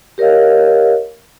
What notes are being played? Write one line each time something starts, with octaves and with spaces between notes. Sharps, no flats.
G4 A#4 C#5 D#5 F5